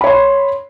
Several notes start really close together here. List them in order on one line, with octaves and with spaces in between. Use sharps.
B5 C#5 C6